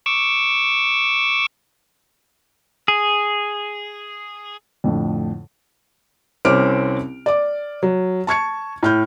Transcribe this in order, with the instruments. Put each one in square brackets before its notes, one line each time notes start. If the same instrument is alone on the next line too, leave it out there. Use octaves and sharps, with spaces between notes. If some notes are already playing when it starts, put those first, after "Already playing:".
[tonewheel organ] C#6 D6 E6
[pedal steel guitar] G#4
[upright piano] F2 A2 D3
[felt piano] C2 C4 C#4 D6 F6 D7
D5 D6
F#3
A5 C#6 G#6 C#7
A2 F6 G6